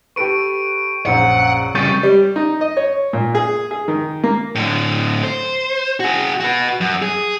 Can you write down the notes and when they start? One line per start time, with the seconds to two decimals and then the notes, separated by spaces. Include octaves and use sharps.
0.16 G4 A4 B4 C#6 D7
1.06 A#1 F#2 C5 F#5
1.75 C#3 G3 C#6 G6 A6
2.03 G3
2.36 D#4
2.61 D#5
2.77 C#5
3.13 A#2
3.35 G#4
3.71 G#4
3.88 D#3
4.24 A#3
4.55 A2 D3
5.23 C5
6.00 F#4 G#4
6.40 F#4 B4
6.81 F#2
7.02 G#4